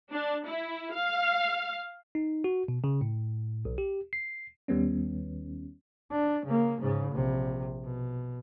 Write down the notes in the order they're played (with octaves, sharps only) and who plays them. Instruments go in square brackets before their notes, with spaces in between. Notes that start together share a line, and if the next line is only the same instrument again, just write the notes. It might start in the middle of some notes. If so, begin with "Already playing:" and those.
[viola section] D4
E4
F5
[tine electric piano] D#4
F#4
B2
C#3
A2
B1
G4
C7
[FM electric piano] D#2 D#3 G3 B3 C#4
[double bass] D4
C#3 A#3
G#2 C#3
A#1 C3
B2